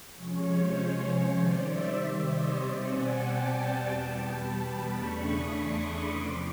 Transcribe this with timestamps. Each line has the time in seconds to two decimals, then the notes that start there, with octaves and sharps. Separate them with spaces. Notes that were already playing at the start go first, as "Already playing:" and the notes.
0.16 C3 F3 G#3 C#4 C#5
0.45 C5
0.75 C#5
1.35 C3 D#3 G3 C5 D5
1.64 D5 E5
2.23 C#5 D#5
2.53 B2 G3 C4 C5 D5
2.83 F#5 G#5
3.13 G5 A5
3.43 F#5 G#5
3.72 E2 B2 G3 B3 G5 A5
4.02 G5 A5
4.32 A5 B5
4.91 E2 C#3 E3 A3 D4 B5 C#6
5.21 C#6 D#6
5.50 C6 D6
5.80 C6 D6
6.09 E2 C3 F3 C6 D6